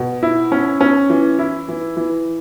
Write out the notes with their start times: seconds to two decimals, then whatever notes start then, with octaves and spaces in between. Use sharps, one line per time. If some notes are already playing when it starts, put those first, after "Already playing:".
Already playing: B2
0.23 E4
0.52 C#4
0.81 C#4
1.10 E3
1.39 E4
1.69 E3
1.97 E3